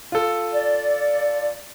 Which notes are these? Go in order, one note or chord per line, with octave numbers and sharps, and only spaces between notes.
F4 A4
D5